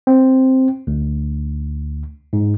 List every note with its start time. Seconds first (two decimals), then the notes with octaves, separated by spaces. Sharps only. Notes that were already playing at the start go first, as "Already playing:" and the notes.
0.07 C4
0.87 D2
2.33 G#2